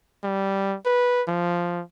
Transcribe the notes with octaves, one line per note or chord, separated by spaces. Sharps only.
G3
B4
F3